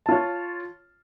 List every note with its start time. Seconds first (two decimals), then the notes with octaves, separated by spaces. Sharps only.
0.06 A5
0.09 F4
0.12 C#5